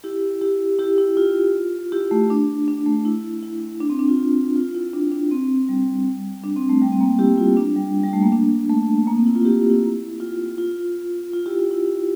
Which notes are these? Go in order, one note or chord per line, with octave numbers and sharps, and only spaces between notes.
E4 G4
E4 G4
E4 G4
E4
F4
E4 G4
A3
D4
D4
A3
E4
E4
D4
C4
D4
F4
F4
E4
D4
D4
C4
G3
D4
C4
A3
G3
C4
A#3
E4 G4
F4
D4
G3
G3
A3
A#3
D4
A3
A#3
C4
E4
F4
E4 G4
E4
F4
F4
F4
E4 G4
F4
E4